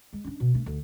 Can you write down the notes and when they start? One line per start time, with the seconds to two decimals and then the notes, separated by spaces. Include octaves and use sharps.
0.13 G#3
0.24 C#4 D4
0.40 B2
0.55 A3 D4
0.66 D2